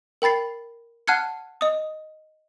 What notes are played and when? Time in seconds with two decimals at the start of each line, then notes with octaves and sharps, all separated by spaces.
0.22 A#4 G5 B5 A6 C7
1.08 F#5 A5 F6 F#6 G#6 C#7
1.61 D#5 D#6